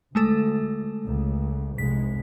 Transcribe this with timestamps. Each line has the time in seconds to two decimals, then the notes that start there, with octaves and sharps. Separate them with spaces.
0.15 D2 G#3 A3 A4
1.05 C#2
1.78 F1 C2 G#3 B6